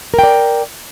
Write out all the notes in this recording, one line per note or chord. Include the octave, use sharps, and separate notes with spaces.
A#4 D5 G5